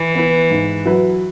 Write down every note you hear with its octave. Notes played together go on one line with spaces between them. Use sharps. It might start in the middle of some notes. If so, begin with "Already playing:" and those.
Already playing: E3
B3 E4 B4
G#2
F#3 E4 B4